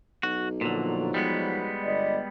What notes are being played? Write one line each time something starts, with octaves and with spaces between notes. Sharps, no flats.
B1 F#4
A#2 D3 F3 F#3
G3 G#3 B3
G1 D5 D#5